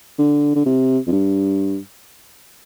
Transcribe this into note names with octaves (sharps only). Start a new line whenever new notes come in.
D3
D3
C3
F2
G2